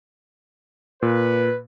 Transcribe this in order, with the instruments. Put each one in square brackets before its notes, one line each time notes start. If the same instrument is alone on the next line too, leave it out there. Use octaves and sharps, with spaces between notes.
[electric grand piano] A#2 [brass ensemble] B4